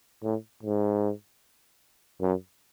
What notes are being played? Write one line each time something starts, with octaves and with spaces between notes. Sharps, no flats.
A2
G#2
F#2